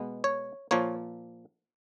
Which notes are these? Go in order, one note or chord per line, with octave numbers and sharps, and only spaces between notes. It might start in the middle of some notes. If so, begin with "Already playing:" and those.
Already playing: B2 G#3 B3
C#5
A#2 F3 A#3 C#5